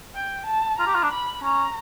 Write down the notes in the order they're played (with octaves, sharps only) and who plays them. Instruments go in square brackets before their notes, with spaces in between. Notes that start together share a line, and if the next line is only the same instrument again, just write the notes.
[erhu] G5
A5
[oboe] F4 [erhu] A#5
[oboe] G4
F4
D4
[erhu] B5
[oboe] C#4 [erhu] A#5